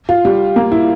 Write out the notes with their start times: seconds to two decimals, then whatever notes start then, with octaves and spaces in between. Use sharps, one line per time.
0.09 F4
0.25 G3
0.56 A#3
0.72 E4